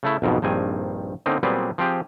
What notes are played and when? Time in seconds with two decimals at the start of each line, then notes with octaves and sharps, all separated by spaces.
0.03 C#3 A3 E4
0.22 B1 F2 G#2 B2
0.42 A#1 G2 D#3 C4 G#5
1.26 D3 A#3 C4 C#4 D#4
1.43 A#2 F#3 G3 B3 C4 G#4
1.78 F3 C4 G4 G#4